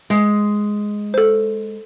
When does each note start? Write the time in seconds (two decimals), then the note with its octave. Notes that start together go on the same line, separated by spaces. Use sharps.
0.10 G#3
1.14 A4 C5